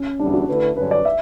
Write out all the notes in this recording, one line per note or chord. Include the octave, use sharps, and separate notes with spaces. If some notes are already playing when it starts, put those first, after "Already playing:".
Already playing: C#4
E2 D3 G3 D4
F#4
D3 A3 E4 B4
G2 D3 F#3 C#4 B4
D5
E5